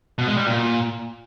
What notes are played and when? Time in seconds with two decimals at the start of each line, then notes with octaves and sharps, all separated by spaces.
0.18 B2
0.28 G#3
0.37 G3
0.47 A#2